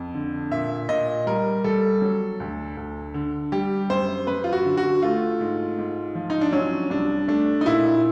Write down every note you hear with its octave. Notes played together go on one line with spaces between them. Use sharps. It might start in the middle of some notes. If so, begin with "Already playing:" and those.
Already playing: F2
D3
A#2 E5
A#2 D#5
G3 A#4
G3 A4
F#3
D2
D2
D3
G3 G4
F#2 C5
F#2 B4
F4
F#4
D3
F#4
A3 F4
G#2
G#2
F3
D#4
D4
F#3 C#4
C2 D4
A3 D4
D#4
A#2 E4